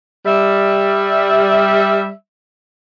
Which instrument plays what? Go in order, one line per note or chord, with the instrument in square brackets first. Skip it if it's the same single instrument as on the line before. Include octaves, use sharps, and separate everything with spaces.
[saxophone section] G3 E5